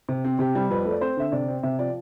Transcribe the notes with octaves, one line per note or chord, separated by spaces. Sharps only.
C3
C4
C3 G4
G3
F2 B4
A3
D5
C4 C5
D3 E5
C3 D5
C4
C3 E5
F3 D5